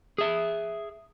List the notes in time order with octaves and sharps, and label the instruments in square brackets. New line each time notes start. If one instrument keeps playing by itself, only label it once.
[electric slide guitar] G#4 E5